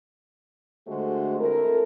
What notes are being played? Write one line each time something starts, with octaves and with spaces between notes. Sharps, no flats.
D3 G#3 A3 F#4 G4 C5
C4 E4 A4 A#4